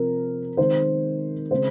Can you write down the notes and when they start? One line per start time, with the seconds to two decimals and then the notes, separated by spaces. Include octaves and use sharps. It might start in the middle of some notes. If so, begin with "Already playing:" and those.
Already playing: C3 F3 C4 A#4
0.57 D#3 G#3 C4 C5
1.51 C#3 G#3 C4 C5